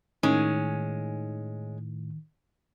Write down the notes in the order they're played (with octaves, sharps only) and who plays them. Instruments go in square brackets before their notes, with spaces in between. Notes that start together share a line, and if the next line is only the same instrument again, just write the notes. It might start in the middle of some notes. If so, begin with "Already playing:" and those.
[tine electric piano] A2 [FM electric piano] D#3 [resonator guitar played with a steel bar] G#3 C#4